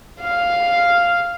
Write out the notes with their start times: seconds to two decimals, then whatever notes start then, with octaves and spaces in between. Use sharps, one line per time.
0.21 F5